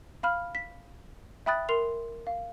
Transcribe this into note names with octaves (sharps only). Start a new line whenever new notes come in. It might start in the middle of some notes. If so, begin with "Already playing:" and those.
F5 B5 F6
B6
E5 G5 B5 D#6 F#6 A6
A#4 C6 C7 F7
F5